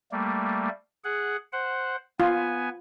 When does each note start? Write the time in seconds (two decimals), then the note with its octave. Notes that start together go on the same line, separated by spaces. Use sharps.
0.12 G3 A3 A#3
1.04 G#4 F#5
1.53 C5 F#5
2.20 B3 F4 G#5